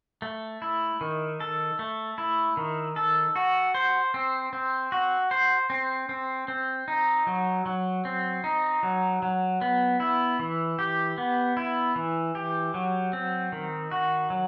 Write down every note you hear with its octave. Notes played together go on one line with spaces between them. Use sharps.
A3
E4
D#3
A4
A3
E4
D#3
A4
F#4
C5
C4
C4
F#4
C5
C4
C4
C4
D#4
F#3
F#3
C4
D#4
F#3
F#3
B3
E4
E3
G4
B3
E4
E3
G4
F#3
C4
D#3
F#4
F#3